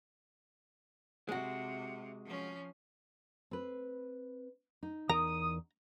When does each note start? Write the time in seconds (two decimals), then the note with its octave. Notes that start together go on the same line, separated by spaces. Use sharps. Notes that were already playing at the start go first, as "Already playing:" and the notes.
1.29 C3 G#3 F#4
2.25 F3 C#4
3.51 C4 B4
4.83 D#4
5.09 E2 A#4 A#5 D#6